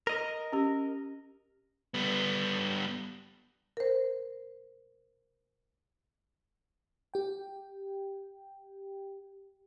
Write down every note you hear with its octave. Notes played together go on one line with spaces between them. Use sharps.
A#4 D#5
C#4 G4
G3 B3
A#4 C5
G4 G5